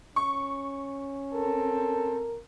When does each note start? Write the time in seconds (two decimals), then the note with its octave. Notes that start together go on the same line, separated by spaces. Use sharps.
0.16 C#4 C#6
1.34 C4 A4 A#4